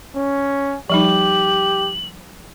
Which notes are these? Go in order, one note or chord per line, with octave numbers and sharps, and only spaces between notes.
C#4
F3 G3 D#4 G4 F#7